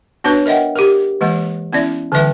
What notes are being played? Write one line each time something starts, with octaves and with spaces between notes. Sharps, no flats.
B3 D4 F#4 B4 C#5
A#4 D#5 E5 F#5 G5
G4 A#4
E3 G#3 A#3 C#5
B3 C#4 E4 D5 E5
D3 E3 G3 B4 E5 G5